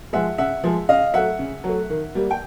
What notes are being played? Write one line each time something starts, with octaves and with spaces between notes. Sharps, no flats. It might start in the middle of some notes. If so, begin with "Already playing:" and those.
F3 G#3 E5 F#5
C#3 E5 F#5
F3 G#3
C#3 D#5 F5
F#3 A3 E5 F#5
C#3
F#3 A3
D#3
G3 A#3
G5